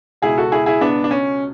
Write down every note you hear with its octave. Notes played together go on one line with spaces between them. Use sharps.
C#2 B2 E4 G#4
F#4 A4
E4 G#4
E4 G#4
B3 D4
D4
C#4